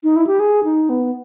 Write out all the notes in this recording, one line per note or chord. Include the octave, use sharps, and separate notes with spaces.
D#4
E4
G4
G#4
D#4
B3